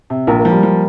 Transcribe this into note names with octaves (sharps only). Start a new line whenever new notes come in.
C3
A#1 A#3
A#3
F3
G3
F3